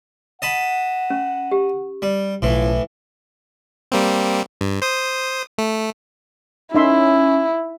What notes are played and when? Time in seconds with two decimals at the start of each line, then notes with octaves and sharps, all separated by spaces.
0.42 D#5 F#5 A5 B5
1.10 C#4
1.51 G4
2.02 G3
2.42 B1 A2 E3 F3 C#4 E4
3.92 G3 A#3 C4
4.61 G2
4.82 C5 D#6
5.58 A3
6.75 C#4 D#4 E4 E5 C6